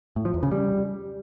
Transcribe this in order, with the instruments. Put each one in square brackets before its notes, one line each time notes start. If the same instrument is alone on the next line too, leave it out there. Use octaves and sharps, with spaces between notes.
[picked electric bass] A2
F3
E2
C#3
G3